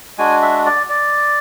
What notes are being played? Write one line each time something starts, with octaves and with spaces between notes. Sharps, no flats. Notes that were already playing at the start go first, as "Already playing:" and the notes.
G#3 D4 F#4 G#5
E5
D5
D5